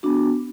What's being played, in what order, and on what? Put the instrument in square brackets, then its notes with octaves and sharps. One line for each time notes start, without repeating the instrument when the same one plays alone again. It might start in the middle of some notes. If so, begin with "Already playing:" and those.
[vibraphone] B3 D4 F#4